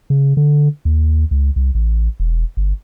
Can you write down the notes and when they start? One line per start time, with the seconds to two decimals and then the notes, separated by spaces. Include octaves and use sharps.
0.10 C#3
0.37 D3
0.85 D#2
1.31 C#2
1.56 C2
1.75 A1
2.20 E1
2.57 G1